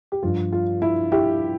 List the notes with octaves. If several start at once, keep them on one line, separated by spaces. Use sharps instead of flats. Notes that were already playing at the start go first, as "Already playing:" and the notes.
G4
G2 F3 F4
F4
E4
E4 G4